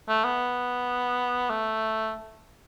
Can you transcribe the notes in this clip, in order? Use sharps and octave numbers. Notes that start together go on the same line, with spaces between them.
A3
B3
A3